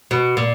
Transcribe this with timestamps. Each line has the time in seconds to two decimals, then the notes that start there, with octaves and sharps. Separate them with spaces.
0.11 B2
0.37 A#2